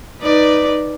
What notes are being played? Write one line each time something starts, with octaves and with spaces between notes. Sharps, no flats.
D#4 B4 D5